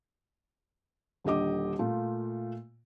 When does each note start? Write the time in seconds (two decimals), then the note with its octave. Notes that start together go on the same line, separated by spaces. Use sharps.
1.24 D#1 D3 G4 D#5 D6
1.79 A#2 A3 F4